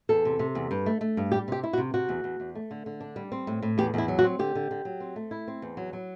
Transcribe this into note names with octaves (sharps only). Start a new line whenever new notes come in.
E2 A4
C3
C3
E2
G2
A3
A3
G2
G3 G4
C3 G4
E4
F#4
C3
C3 F#4
E2
E2
E2
A3
D3
D3
D4
G3
C4
A2
A2
E2 G4
E2 E4
F#3
F#4
C4
D3 G4
D3
D3
F#3
C4
A3
E4
C4
E2
F#3
F#3